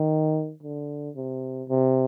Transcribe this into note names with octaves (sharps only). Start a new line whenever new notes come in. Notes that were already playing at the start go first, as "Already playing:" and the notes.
Already playing: D#3
D3
C3
C3